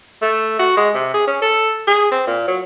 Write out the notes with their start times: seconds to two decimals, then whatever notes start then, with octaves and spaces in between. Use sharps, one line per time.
0.22 A3
0.59 F#4
0.77 G#3
0.94 C3
1.14 G#4
1.27 C#4
1.42 A4
1.87 G#4
2.11 C4
2.27 A#2
2.47 F#3